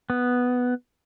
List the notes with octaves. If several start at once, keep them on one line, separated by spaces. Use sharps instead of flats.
B3